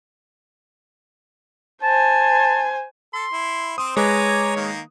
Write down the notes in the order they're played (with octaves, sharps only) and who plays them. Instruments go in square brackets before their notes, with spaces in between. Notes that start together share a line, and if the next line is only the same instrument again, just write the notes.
[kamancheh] C5 G#5 [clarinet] A5
[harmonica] A4 [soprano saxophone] C6
[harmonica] E4
[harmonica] C4 C5 [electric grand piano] D#6
[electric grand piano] G#3 B4 [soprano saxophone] C#5 [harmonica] G#5 A#5 D6
[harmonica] D#3 A#3